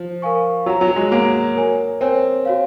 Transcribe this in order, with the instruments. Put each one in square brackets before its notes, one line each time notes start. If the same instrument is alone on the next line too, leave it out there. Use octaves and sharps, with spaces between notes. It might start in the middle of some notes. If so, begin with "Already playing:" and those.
Already playing: [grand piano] F3
[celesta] A#4 F5 G#5 C#6
[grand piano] F#3 [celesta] F#4 C#5 F#5 A#5
[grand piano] F#3
G#3
[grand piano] A#3 [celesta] F#4 C#5 F#5 A#5
[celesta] A#4 C#5 G#5
[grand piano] C4 [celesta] A#4 C#5 G#5
[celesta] F#4 C#5 F5